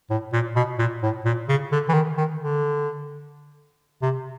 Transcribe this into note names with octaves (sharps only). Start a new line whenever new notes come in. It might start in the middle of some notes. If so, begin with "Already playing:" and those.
A2
A#2
B2
A#2
A2
A#2
C#3
D3
E3
D#3
D#3
D3
C3